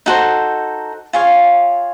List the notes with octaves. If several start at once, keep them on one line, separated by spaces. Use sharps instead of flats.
D#4 F#4 A4 C5
F4 G#4 C#5 F5